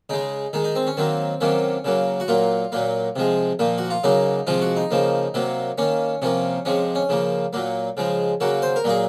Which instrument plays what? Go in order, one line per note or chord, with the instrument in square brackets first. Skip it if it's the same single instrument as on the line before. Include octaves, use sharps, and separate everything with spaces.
[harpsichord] C#3 G#3 D#4
D#3 G#3 D#4
D#4
C4
C#4
D#3 F#3 A#3 C4
C3 D#3 F#3 A#3 C#4
C#3 F#3 A#3
F#4
A#2 F#3 A#3 F4
A#2 F#3 A#3
C3 F3 G#3
A#2 F3 A#3
F#4
F4
C#3 F#3 A#3 D#4
C3 F3 G#3 F4
F#4
D#4
C#3 F3 A#3
C3 F#3 A#3
D#3 A#3 C#4
C3 F3 A#3 C#4
C3 F3 G#3 C#4
C#4
C#3 F3 A#3
A#2 F#3 A#3
C#3 F3 G#3
C#3 F#3 A#3 F#4
C5
A#4
A#2 F#3 A#3 G#4